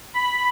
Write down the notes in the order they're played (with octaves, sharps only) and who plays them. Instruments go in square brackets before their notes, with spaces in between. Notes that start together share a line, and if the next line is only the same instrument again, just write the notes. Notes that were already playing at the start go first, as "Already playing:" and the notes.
[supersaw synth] B5